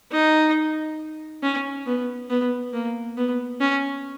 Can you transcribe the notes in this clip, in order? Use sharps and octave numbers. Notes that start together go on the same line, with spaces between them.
D#4
C#4
B3
B3
A#3
B3
C#4